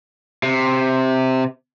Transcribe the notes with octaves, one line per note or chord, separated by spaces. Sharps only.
C3